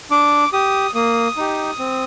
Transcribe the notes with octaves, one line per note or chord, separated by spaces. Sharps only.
D4 D6
G4 D#6
A#3 D#6
D#4 G4
C4